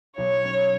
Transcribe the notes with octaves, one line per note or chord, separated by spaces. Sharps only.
B1 C#5
C#4